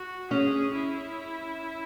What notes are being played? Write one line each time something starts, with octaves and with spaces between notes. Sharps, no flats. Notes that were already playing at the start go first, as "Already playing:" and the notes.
Already playing: F#4
C#4 G#4
E4